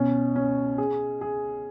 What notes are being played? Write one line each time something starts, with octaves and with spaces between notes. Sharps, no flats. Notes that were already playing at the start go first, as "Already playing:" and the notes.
Already playing: B2 C#4
C#4
G#4
G#4